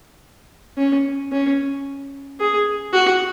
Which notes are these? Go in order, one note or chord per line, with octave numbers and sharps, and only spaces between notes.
C#4
C#4
G#4
F#4